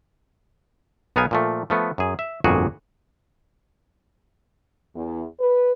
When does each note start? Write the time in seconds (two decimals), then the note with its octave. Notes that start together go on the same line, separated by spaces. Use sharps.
1.16 B1 B3 D#4 A#4 F5 G#5
1.31 A#2 F3 A3
1.70 F3 A3 B3
1.98 F#2 G#4
2.19 E5
2.44 G1 F2 A#2 F#4 G#4
4.95 E2
5.40 B4